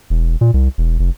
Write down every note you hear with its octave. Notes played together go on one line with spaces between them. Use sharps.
E1
A#2
C2
E1
F1